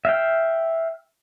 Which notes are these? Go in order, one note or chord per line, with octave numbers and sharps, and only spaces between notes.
E5 F5 G5